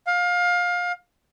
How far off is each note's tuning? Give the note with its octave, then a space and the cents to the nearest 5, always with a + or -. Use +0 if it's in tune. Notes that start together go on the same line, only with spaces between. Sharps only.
F5 +25